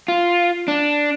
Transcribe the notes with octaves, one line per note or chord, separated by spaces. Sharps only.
F4
D4